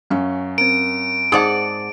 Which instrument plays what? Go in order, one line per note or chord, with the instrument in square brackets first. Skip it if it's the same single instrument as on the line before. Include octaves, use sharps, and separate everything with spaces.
[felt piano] F#2 C#4 [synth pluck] F5
[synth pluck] C4 A#4 [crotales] D7
[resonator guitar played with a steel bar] G#2 D5 F#5 [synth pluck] G#4 C5 A5 [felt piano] D#6